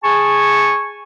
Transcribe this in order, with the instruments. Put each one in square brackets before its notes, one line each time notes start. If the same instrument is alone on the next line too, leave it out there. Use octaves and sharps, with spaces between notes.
[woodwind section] G#4 G#5 A5 C#6